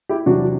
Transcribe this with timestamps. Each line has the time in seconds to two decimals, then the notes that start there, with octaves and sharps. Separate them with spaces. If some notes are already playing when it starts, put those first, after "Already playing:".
0.09 E4 G4
0.26 E2 C3 F#3 D4 F#4